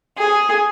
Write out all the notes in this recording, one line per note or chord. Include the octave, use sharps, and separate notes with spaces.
G#4